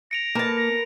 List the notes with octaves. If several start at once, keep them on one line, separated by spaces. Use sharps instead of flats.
A#6 C#7 D7 F7
A#3 A#4 B4 A5
A#6